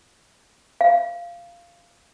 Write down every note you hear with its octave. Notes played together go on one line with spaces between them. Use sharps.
F5